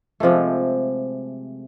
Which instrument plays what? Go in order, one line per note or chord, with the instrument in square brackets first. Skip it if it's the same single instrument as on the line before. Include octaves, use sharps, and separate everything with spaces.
[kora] C3 F3 G#3 A3